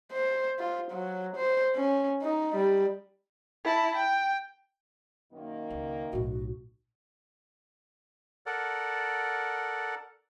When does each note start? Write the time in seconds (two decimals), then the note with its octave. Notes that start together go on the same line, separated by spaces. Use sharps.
0.12 C5
0.59 F4
0.91 F#3
1.36 C5
1.76 C#4
2.22 D#4
2.55 G3
3.64 E4 A5
3.95 G5
5.33 F#2 D#3 A#3
5.70 C#2
6.13 B1 A2 F#4
8.46 A4 A#4 D5 F#5